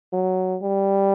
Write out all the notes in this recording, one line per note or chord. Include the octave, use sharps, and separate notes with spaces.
F#3
G3